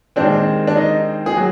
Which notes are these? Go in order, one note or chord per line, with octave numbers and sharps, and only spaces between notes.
D#2 D#3 G#3 C4 D4
D4
D#4
G#4
F#3